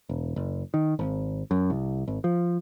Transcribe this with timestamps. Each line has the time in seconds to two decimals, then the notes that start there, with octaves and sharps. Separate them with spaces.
0.09 E1
0.36 F#1
0.74 D#3
0.99 G#1
1.51 F#2
1.70 C2
2.08 G#1
2.24 F3